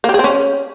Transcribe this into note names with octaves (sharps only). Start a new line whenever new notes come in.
A#3
G4
G#4
C4
C#4